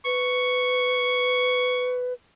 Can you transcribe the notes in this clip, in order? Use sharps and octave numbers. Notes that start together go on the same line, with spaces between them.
B4 C#6